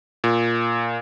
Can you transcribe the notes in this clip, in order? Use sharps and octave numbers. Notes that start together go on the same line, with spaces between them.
A#2